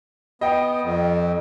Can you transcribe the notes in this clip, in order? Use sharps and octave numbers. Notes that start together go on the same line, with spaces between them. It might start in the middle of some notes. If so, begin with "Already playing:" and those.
B3 D#5 G5
F2